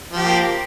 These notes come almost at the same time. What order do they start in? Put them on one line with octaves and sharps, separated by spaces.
F3 G4 A#3